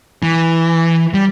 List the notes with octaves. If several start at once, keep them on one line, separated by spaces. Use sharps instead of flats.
E3
G3